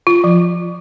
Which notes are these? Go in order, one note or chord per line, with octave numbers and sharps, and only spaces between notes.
F4
F3